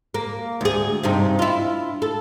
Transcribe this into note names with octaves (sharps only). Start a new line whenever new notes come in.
A#3
D2 G#4
G2 C3 D#4
E4 F4
A4